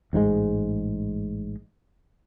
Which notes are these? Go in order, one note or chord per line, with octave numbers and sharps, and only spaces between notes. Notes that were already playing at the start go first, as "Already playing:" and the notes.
A1 G#2 B2 G#3